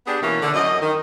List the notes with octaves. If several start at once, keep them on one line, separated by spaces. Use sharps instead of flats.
B3 D4 G4 G#4
B2 E3 A#3 C#4
D3
F#2 D#5
D#3